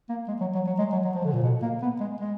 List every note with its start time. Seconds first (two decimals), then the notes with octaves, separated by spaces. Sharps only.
0.09 A#3
0.28 G#3
0.40 F#3
0.54 F#3
0.67 F#3
0.79 G#3
0.92 F#3
1.04 F#3
1.15 F3
1.25 D3
1.33 A#2
1.43 B2
1.62 A#3
1.82 B3
2.00 G#3
2.20 G#3